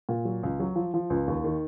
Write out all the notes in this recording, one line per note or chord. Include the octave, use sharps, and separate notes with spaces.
A#2
F#3
C#2
F#3
F3
F3
C#2
D#2
D#3